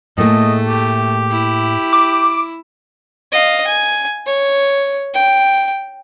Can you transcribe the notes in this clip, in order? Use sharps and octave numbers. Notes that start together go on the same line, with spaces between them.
A2 A3 A#3 G#4 D#5
G4
E4
D6
D#5 F5
G#5
C#5
G5